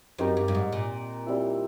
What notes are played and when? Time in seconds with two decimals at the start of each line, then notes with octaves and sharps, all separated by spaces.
0.18 F#2 C4 D#4 G4 A#4
0.37 G2
0.48 G2
0.55 G#2
0.72 A#2
1.26 G3 C4 E4